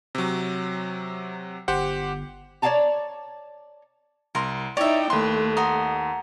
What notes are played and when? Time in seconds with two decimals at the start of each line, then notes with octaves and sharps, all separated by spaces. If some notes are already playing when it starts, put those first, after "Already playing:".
0.15 C3 F#3
1.68 G1 G4 C5 F#5
2.62 C#5 D5 F5 G5 A5 A#5
4.35 C2 A#4 C6
4.77 D#4 E4 C#5 D5 E5 G5
5.10 D#2 A3 B4 C6
5.57 D#5 F#5 A#5